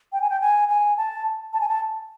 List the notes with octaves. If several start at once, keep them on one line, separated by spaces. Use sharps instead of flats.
G5
G#5
G5
G#5
G#5
A5
A5
G#5
A5